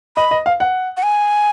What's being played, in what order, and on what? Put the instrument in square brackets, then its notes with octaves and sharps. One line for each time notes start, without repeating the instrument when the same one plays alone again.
[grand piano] D#5 [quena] B5
[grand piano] D#5
F5
F#5
[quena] F#5
G#5